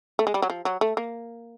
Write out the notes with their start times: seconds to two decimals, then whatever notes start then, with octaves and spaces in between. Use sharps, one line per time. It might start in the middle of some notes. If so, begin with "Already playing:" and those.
0.19 A3
0.27 G#3
0.34 G3
0.42 F#3
0.50 F3
0.65 F#3
0.81 A3
0.97 A#3